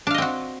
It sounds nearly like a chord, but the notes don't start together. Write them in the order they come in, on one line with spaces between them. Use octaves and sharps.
D4 F5 D#5 C4 F#4